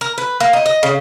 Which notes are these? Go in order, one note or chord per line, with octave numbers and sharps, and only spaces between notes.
A#4
B4
A#3
D#4
D#5
C#3